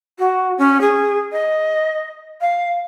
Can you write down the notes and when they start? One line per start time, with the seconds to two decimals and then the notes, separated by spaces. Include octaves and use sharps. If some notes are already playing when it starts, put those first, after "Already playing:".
0.18 F#4
0.58 C#4
0.80 G#4
1.32 D#5
2.40 F5